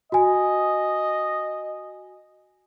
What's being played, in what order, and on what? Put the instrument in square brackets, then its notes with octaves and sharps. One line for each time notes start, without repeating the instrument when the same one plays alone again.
[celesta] F#4 G#5 [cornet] D#5